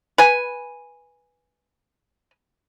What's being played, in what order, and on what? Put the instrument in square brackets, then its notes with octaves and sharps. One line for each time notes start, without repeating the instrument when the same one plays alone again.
[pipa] B4 G#5